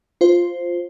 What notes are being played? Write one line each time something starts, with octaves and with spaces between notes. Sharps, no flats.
F4 C5